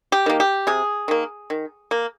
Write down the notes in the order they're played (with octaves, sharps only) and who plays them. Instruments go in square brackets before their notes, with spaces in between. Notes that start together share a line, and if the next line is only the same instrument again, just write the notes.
[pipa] G4
D#3 A#3
G4
C3 G#4
D#3 A#3
D#3
A#3